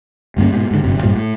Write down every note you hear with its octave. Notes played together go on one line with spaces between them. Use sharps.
G1 G2 A#3 C#4
G#2 B2
G#2 D3
G1 F#2 C3
A#1 G2 A#2 F3
A2